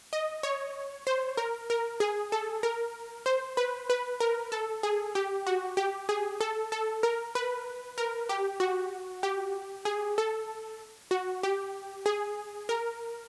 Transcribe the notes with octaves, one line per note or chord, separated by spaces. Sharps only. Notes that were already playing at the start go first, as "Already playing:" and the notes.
D#5
C#5
C5
A#4
A#4
G#4
A4
A#4
C5
B4
B4
A#4
A4
G#4
G4
F#4
G4
G#4
A4
A4
A#4
B4
A#4
G4
F#4
G4
G#4
A4
F#4
G4
G#4
A#4